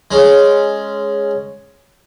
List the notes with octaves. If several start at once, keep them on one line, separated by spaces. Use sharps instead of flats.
G#3 C#4